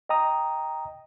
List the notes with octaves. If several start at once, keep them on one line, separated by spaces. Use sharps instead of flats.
D#5 G5 A#5 D#6